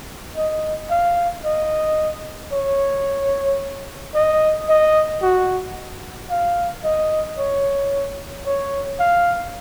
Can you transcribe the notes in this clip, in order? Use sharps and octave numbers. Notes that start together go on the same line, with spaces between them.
D#5
F5
D#5
C#5
D#5
D#5
F#4
F5
D#5
C#5
C#5
F5